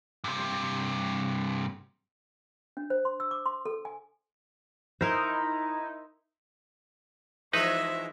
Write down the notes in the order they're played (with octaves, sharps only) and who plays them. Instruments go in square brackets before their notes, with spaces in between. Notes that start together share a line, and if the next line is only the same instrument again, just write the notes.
[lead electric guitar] G2 C3
[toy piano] D4
C5
C6
E6
D6
C6
A4
G#5
[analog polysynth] D#4 E4 [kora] A#4 C5
[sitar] E3 F3 G#3 [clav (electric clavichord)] D#4 B4 [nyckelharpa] E5